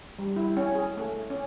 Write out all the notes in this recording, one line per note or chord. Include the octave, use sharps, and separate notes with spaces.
G3
E4
C#4
G#4
A3
C#4